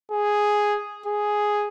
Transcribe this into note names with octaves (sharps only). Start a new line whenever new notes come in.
G#4
G#4